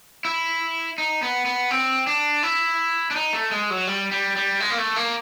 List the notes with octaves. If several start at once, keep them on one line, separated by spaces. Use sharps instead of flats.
E4
D#4
B3
B3
C4
D4
E4
D4
D#4
A3
G#3
F#3
G3
G3
G3
G#3
A#3
A3
A#3